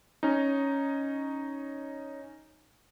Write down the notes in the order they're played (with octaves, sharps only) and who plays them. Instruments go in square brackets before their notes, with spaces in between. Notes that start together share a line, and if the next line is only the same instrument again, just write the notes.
[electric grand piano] C#4 D#4